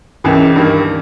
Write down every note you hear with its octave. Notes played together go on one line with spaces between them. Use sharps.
C#2 C#3 E3 A#3
G2 D#3 A#3